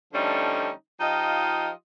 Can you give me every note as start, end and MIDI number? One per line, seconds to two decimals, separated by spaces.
0.13 0.70 50
0.13 0.70 53
0.13 0.70 55
0.13 0.70 57
0.13 0.70 61
0.13 0.70 63
1.01 1.70 53
1.01 1.70 63
1.01 1.70 65
1.01 1.70 67
1.01 1.70 75